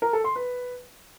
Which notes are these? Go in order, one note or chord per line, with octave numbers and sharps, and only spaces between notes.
A#4
A4
C6
B4